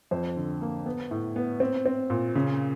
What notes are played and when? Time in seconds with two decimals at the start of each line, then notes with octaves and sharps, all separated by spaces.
0.11 F2 C5
0.36 D3
0.61 A#3
0.86 B3
1.11 A2
1.36 B3
1.60 C4
1.86 C4
2.10 A#2
2.35 C#3